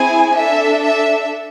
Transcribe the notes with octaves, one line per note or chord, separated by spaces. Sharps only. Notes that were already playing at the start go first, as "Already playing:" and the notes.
Already playing: C4 E4 G#4 G#5
D4 A4 E5
E5